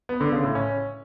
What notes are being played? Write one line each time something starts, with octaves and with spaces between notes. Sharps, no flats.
B3
D3
C#3
A2
C#4